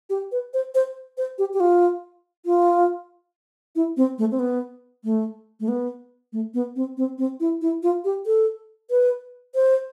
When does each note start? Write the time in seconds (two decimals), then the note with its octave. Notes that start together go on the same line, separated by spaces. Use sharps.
0.10 G4
0.32 B4
0.54 C5
0.75 C5
1.18 C5
1.39 G4
1.54 G4
1.60 F4
2.46 F4
3.76 E4
3.97 C4
4.18 A3
4.31 C4
4.39 B3
5.04 A3
5.60 A3
5.68 B3
6.33 A3
6.54 B3
6.76 C4
6.97 C4
7.18 C4
7.40 E4
7.62 E4
7.83 F4
8.05 G4
8.26 A4
8.90 B4
9.55 C5